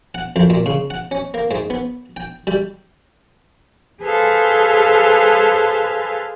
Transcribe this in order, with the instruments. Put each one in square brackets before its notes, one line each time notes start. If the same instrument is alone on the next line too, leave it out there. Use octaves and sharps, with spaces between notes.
[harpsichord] F#5
F2
A#2
C#3
F#5
C#4
A#3
G#2
B3
G5
G3
[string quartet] G#4 A4 B4 C5 F5 G#5